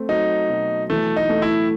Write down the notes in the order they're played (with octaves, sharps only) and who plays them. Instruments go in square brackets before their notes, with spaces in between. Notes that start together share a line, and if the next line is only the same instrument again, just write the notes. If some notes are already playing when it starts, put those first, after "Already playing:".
Already playing: [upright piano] A3 C4
[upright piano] F#3 [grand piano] D#4
[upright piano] B2
[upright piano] E3 [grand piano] A3
[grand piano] D#4
[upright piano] A3
[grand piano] E4